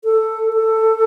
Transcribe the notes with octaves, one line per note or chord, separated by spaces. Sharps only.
A4
A4